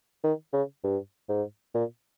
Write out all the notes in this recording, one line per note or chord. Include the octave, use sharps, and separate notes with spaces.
D#3
C#3
G2
G#2
A#2